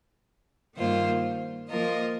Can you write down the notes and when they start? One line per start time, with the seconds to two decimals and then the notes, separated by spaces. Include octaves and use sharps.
0.76 G2 D#3 A#3 F4 C5
1.70 F3 A#3 F4 A#4 D#5